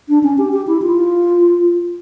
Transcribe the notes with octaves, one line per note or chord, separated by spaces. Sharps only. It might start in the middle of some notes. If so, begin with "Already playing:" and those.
D4
C#4
G4
G4
E4
F4